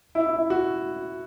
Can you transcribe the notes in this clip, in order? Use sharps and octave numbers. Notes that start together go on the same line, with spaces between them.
E4
E4
E4
F#4